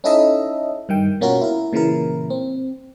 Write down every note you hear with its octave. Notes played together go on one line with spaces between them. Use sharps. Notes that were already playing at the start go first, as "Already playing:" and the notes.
C#4 D#4 E4 A4 D#5 E5
G2 D#3 G5
B2 A#3 C#4 F4 F#4 A#4
E4 A#4
A#2 C#3 E3 E4 A#4
C4